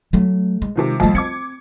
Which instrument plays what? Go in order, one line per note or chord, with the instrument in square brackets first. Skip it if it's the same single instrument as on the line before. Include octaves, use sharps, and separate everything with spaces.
[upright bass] F#3 A3
G#3
[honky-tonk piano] C3 D#3 F3
[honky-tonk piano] F2 D#5 A5 [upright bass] G3 A3
[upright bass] C4 [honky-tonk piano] D6 G#6 C#7